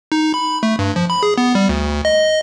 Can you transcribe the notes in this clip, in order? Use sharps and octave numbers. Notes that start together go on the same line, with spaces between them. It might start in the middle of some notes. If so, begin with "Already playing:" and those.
D#4
B5
A3
G2
F3
B5
G#4
B3
G3
D2
D#5